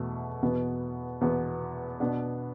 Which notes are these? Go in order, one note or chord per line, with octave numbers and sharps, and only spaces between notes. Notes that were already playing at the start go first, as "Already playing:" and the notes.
Already playing: E2 B2 A3
E2 B2 B3
E2 B2 B3
B2 B3 D4